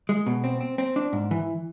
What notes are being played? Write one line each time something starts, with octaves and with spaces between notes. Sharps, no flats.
G#3
B2
C4
C4
C4
D4
G#2
E3